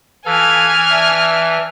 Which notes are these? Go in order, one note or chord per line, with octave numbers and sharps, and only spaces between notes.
E3 F4 A4 F5 G#5 F6
D4 E5